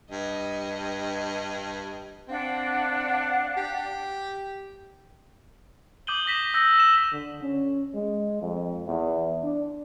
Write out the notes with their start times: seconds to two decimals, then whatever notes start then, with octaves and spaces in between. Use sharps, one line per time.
0.11 G2 D#5
2.29 C4 D4 F5 F#5
3.57 G4
6.07 D6 D#6 G6 D#7 F#7 G7
6.26 D#6 A#6 B6 E7
6.54 E6 G6 A#6
6.76 E6 E7
7.12 D3
7.42 C#4
7.94 G#3
8.42 F2
8.87 E2
9.44 D4